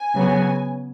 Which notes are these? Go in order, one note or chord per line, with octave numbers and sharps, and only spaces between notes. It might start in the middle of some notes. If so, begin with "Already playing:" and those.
Already playing: G#5
C#3 F#3 B3